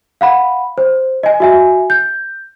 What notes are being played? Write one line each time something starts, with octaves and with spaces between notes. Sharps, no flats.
F5 F#5 B5
C5
D#5 G#5
F#4 E5 G#5
G6